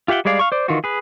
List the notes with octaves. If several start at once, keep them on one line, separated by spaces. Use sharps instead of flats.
F4 G4 E5 F#5 G5
G3 G#3 G#4 D5 F5
F5 C#6
C5 D5
D#3 E3 F4 F#4
G#4 B4